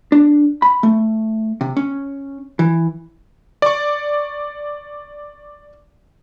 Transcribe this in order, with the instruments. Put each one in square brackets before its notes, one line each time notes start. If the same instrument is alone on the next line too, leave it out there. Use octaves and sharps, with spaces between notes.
[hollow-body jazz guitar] D4
B5
A3
C3
C#4
E3
[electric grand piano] D5 C#6